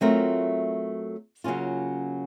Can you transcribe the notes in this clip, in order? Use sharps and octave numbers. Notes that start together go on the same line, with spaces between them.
F#3 A3 C4 F4 A#4
C#3 F#3 A#3 C#4 F4